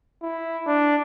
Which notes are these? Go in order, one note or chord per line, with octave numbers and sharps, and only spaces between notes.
E4
D4